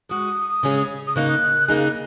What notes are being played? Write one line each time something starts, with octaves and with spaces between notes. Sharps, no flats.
G#3 F#4 D#6
C#3 G#3 C#4 G#4
D#6
C#3 A#3 D#4 F#6
C#3 A#3 D#4 G#4